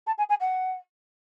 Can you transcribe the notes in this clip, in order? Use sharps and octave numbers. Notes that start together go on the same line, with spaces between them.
A5
G#5
G#5
F#5